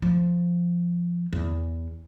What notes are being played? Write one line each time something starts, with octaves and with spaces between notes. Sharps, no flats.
F3
E2